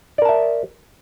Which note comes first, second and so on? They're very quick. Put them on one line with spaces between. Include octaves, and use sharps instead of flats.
D5 A#4 A5 E5